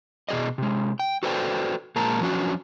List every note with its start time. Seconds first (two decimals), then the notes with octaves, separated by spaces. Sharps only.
0.29 B2 A3 G#4 D5 D#5
0.58 C3 G#3
0.99 G5
1.23 F#4 A4 B4 C5 D5 G5
1.96 A#2 G#3 A#4 A5 A#5
2.21 F3 F#3 C#4 D4 F#4